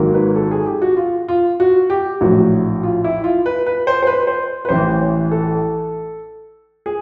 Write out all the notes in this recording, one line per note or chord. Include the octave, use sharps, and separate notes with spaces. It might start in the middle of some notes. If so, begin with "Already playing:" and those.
Already playing: G#1 G#2 D#3 F#3 A#3
B4
A4
G#4
G4
F#4
F4
F4
F#4
G4
A#1 A2 F#3 F#4
F4
E4
F4
B4
B4
C5
C5
B4
C5
B4
A1 A2 E3 C5
C#5
A4
G#4